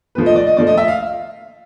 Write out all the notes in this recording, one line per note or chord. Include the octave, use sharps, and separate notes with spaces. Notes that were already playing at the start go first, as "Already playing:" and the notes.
A#2 F3 A3 B4
D#5
D5
D#5
A#2 F3 A3 D5
D#5
E5
F5